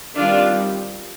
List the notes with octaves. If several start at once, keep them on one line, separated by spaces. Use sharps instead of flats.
D#3 G3 C4 D4 F4